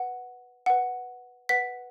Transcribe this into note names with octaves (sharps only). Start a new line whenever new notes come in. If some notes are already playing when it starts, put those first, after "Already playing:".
Already playing: B4 F#5
B4 F#5
B4 F#5 B6